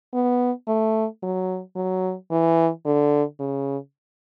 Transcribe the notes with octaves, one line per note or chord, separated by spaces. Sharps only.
B3
A3
F#3
F#3
E3
D3
C#3